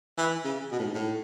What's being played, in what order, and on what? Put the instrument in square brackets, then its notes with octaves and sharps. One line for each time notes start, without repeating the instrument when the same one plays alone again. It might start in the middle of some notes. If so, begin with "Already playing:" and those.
[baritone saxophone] E3
C#3
B2
A2
G#2
A2